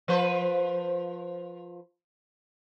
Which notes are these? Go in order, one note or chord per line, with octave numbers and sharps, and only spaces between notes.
F3 B4 C5